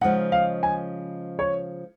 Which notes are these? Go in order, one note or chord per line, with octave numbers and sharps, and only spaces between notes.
C#3 F3 G#3 D#4 F#5
F5
G#5
C#5